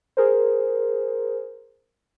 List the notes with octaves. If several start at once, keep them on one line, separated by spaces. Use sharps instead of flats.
G#4 A#4 C5